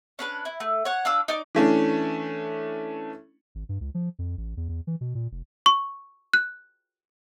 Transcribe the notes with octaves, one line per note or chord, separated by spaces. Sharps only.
C#4 D4 B4
E4
A3
C#5 F#5
D4 F4 D6 E6
D#4 D5 D6
E3 A3 C#4 D4
G#1
G2
C#2
F3
F2
A1
E2
E2
E3
B2
A#2
F1
C#6
F#6